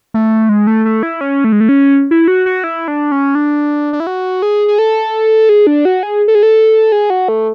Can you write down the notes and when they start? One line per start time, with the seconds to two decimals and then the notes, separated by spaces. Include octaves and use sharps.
0.14 A3
0.49 G#3
0.67 A3
0.85 A3
1.03 E4
1.21 C#4
1.44 A3
1.52 G#3
1.60 A3
1.69 C#4
2.11 E4
2.28 F#4
2.46 F#4
2.64 E4
2.88 D4
3.12 C#4
3.35 D4
3.93 D4
4.00 E4
4.07 F#4
4.42 G#4
4.68 G#4
4.79 A4
5.49 G#4
5.67 D4
5.85 F#4
6.03 G#4
6.28 A4
6.35 G#4
6.43 A4
6.92 G#4
7.10 F#4
7.28 A3